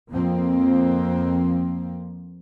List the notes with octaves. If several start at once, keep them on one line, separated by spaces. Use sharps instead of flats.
F2 F3 A#3 C4